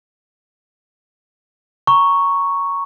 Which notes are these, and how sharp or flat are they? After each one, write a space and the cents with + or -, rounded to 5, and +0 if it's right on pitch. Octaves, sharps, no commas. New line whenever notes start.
A#5 +0 C#6 +0